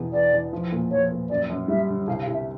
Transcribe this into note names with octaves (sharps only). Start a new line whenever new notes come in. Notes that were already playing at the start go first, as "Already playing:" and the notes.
Already playing: E2 B2 B3
E2 D5
E2
F3
A#2
F3 C#5
A#2
F#2 D5
F#2
G3 E5
D3
C2 F5
F5
C2
E5